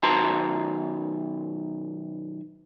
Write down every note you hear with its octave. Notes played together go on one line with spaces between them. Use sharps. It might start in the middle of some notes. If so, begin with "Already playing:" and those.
B1 D#3 F#4 A5 A#5 C6